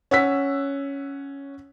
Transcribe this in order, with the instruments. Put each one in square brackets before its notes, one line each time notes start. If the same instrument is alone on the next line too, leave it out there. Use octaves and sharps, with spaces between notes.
[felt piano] C#4 F#5 E6 B6